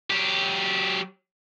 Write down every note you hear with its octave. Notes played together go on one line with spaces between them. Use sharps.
F#3 G4